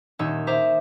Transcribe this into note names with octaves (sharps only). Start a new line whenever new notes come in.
D#1 D#4 C#5 E6
C5 E5 A#5 D6